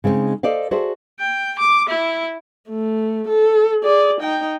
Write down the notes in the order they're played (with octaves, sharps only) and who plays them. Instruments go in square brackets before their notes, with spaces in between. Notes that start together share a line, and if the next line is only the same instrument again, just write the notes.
[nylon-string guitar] C#3 G#3 C4 C#4 D#4
A4 C5 D5 D#5 F5
F#4 G#4 A4 C5 D5 E5
[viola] G5
D6
E4
A3
A4
G#4 D5
D#4 G5